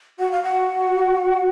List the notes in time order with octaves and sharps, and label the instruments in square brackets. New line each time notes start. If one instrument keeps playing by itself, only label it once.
[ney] F#4 [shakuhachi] F#5
[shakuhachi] F5
F#5